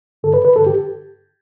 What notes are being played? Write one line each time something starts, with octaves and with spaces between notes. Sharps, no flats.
G2 D3 A4
B4
B4
G2 D3 A4
G4